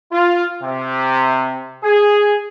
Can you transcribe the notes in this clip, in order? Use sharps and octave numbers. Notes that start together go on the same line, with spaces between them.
F4
C3
G#4